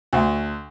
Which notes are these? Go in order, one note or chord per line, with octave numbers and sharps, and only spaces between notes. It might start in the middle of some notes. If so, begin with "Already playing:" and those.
D2